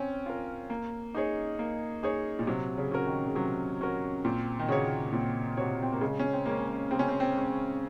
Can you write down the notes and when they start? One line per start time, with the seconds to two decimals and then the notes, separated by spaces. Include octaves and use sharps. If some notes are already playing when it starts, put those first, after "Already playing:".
Already playing: C4 C#4
0.26 F4 A#4
0.70 A#3
1.15 D#4 G#4 C#5
1.59 A#3
2.03 D#4 G#4 C#5
2.39 A#2
2.47 C3 F#3
2.77 C#3
2.91 C#4 F#4 A#4
3.06 D#3
3.26 C#3
3.35 C3 F#3
3.81 C#4 F#4 A#4
4.25 A#2 C4
4.59 D#3
4.69 C#3 F#4 C#5
5.12 A#2 C4
5.57 C3 F#4 C#5
5.82 C4
5.92 A#3
6.01 C#3 G#3
6.19 C#4
6.33 C4
6.46 G#3 A#3 C#4
6.91 C#3 C4
6.99 C#4
7.08 C4
7.20 C4
7.34 G#3 C#4